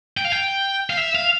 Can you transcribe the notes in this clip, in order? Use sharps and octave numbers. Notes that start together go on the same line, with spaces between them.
G5
F5
G5
F5
E5
F5